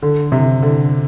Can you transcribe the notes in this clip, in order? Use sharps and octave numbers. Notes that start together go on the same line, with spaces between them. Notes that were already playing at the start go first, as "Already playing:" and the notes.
D3
C3
D3